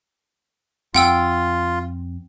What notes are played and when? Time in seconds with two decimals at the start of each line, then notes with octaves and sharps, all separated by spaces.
0.95 F2 C4 F4 F#5 G5 E6